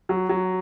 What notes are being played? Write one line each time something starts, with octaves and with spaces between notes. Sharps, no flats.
F#3
F#3